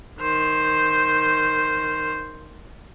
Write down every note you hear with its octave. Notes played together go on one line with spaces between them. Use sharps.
D#3 C5